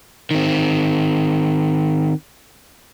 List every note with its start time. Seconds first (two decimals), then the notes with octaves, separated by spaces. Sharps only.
0.31 D#3 C4